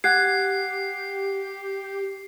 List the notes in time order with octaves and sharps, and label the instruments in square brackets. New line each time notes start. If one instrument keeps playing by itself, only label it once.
[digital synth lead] G4 [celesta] F#5 F#6 G#6 [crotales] C7